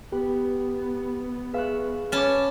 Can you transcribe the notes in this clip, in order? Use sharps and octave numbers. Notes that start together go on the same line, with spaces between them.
B3 G4 B4
G#4 B4 E5 F5 C#6 F#6
C#4 C#5 A5 B5 D6